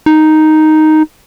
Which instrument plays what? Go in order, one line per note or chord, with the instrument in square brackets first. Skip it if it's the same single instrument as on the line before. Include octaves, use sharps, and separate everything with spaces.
[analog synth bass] D#4